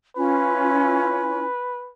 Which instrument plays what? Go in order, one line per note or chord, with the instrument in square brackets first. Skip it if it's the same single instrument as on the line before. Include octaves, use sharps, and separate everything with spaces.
[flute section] C#4 E4 F4 [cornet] B4